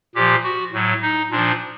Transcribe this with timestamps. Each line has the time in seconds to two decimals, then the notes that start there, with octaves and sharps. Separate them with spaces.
0.15 A#2 F3 G4
0.44 F#4
0.73 A2 F#3
1.02 D#4
1.31 A#2 F3 D4